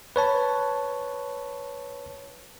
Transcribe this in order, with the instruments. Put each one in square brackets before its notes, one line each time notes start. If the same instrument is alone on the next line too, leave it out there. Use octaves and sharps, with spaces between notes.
[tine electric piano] B4 C#5 A5